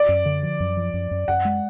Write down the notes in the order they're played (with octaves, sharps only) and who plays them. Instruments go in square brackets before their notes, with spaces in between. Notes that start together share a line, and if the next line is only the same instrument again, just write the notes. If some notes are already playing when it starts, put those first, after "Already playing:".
Already playing: [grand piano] D5
[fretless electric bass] F#2
D3
F3
F#2
F3
F#2
F#2
[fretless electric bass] F#2 [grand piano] F#5
[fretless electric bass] G#3